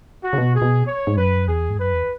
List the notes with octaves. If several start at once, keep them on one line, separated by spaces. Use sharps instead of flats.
F#4
C#3
B2
G#4
B2
C#5
G#2
F#2 B4
E2 G#4
G#2
F#2 B4
E2